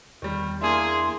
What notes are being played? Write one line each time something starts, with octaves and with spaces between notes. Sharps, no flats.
E2 D#3 G3
A#3 D4 E4 G#4 C6